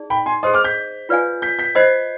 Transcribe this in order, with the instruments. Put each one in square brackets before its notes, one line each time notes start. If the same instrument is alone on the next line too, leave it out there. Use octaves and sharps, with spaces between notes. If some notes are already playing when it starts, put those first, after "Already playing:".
Already playing: [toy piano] D#4 G#4 D5
[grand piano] G5 B5
G#5 C6
[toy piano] G#4 C5 D#5 [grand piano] C6 D#6
[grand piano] D6 F6
G6 B6
[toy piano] F4 B4 D5 F5 G#5
[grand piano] G6 B6
G6 B6
[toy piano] C5 D#5 B5 [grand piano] G#6 C7